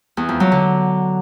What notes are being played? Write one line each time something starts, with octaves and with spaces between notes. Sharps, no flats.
E2
F2
F#3
D3